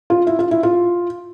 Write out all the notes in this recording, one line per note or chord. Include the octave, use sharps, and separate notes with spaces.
F4
E4
F4
E4
F4